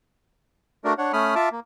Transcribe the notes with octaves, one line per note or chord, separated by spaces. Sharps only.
A3 D4 F#4 A#4 D5
D4 C#5 F#5
A3 C#4 B5 D#6 F6
F4 E5 A5 D6
A#3